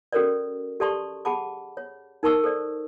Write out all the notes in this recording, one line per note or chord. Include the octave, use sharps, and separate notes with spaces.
C#4 F#4 A4 A#4 C#5 D5
G4 A4 D5 A5 C6 C#6
G#4 F#5 A5 B5 D6
C#5
D#4 A#4 A5 C#6 E6
A4 C5 D5